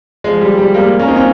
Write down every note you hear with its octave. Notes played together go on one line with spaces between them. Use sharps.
F3 G#3
G3
G3
G3 A#3
A#3 C#4
C4 D#4
C#4 F4